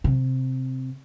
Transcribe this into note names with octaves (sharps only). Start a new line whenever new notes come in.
C3